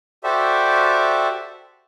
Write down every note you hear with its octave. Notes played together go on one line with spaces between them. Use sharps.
F#4 G4 A4 C5 D5 E5